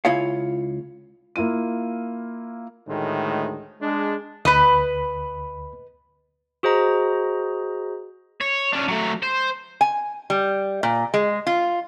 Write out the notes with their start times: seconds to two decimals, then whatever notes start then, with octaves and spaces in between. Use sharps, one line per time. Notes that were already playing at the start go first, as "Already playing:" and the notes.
0.05 C#2 E4 F4 C#5 F5
1.36 A#3 E4 F4 D#7
2.88 D2 A2 D#3 G#3
3.81 G#3 D4
4.45 D2 B4 D#5 B5
6.63 F#4 G#4 C5 D#5 A#5
8.41 C#5
8.73 C#4 D4
8.88 F#3 A3
9.23 C5
9.81 G#5
10.30 G3
10.83 A#2
11.14 G#3
11.47 F4